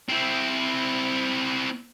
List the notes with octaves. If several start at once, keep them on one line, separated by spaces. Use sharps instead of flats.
C4 E4